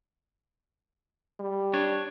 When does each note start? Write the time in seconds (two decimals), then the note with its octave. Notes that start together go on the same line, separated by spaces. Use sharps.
1.40 G3
1.73 D4 C#5